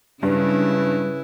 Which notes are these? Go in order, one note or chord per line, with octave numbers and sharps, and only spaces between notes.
G2 C#3 G3 E4 B4